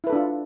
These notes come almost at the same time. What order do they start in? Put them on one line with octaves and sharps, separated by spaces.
E4 B4 A4 D4 F4